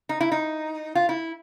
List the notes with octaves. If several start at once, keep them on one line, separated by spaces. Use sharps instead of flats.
D#4
E4
D#4
F4
E4